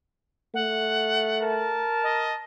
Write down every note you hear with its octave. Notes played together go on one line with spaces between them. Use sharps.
A3 F#5
A#4 A5
D#5